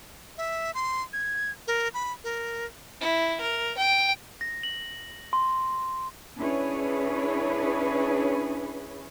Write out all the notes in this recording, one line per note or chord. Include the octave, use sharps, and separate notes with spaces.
E5
C6
G#6
A#4
B5
A#4
E4
A#4
G5
A#6
F#7
C6
C#4 D4 E4 G#4 B4 C#5